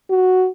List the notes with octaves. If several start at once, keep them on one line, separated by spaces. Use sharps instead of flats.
F#4